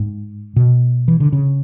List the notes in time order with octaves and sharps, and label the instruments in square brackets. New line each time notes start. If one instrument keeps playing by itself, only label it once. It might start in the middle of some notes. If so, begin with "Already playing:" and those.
Already playing: [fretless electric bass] G#2
B2
E3
D3
C#3